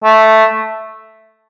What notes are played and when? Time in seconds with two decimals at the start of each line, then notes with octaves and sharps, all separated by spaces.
0.04 A3